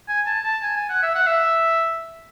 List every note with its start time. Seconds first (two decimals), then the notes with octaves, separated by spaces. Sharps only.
0.09 G#5
0.26 A5
0.44 A5
0.62 G#5
0.76 G#5
0.89 F#5
1.03 E5
1.15 F#5
1.27 E5